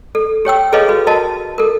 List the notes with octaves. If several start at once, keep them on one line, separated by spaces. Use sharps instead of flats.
A4
G4 C#5 G5 E6
G#4 A4 B4 C#5 D#5 F5
F#4 B4
F#4 A#4 D#5 A5
A4 A#4